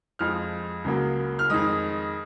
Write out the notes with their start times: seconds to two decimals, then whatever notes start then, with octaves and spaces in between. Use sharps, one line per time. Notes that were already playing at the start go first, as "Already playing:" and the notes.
0.19 F2 F3 G#3 F6
0.84 C#2 C#3 F#3 A#3
1.39 F6
1.50 F2 D#3 G#3 D#6